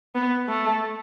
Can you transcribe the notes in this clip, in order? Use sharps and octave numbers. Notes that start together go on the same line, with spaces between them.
B3
A3